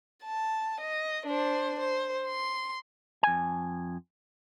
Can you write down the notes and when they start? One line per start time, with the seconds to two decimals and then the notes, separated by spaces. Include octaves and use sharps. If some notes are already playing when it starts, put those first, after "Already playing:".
0.24 A5
0.81 D#5
1.26 D4 C5
1.80 C5
2.26 C6
3.23 F2 G#5